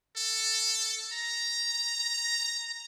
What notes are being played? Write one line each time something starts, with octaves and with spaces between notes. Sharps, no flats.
A4
A#5